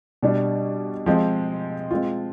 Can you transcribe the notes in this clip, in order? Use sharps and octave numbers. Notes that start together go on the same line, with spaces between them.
B2 G3 D4
F3 G#3 C4
G#3 C4 F4